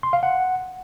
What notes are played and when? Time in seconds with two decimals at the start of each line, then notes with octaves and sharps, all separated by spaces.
0.03 C6
0.13 F5
0.23 F#5